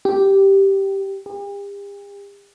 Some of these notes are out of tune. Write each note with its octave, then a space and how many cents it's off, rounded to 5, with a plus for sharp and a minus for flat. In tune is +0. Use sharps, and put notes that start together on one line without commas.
G4 -5
G4 +45